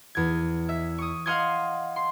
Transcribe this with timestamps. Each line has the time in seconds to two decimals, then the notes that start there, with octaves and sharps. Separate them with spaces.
0.15 E2 G#6
0.69 E5
0.98 C#6 D#6
1.26 D#5 F5 F#5 C6 D#6 G#6
1.96 C6